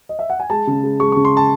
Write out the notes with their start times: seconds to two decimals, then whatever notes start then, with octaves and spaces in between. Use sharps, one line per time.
0.09 D#5
0.19 E5
0.30 F#5
0.40 G#5
0.50 G#3 A5
0.67 C#3
0.83 G#3
1.00 G#3 C#6
1.12 C#6
1.16 C#3
1.25 C6
1.37 A5